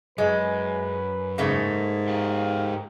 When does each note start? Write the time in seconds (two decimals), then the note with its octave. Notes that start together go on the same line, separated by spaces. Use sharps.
0.18 F#2 G#3 B4
1.38 G#2 C#3 A3 A#3
2.08 G4 A#4 F5